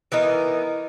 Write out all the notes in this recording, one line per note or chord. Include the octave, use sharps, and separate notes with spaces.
E3 B3 D#4 A#4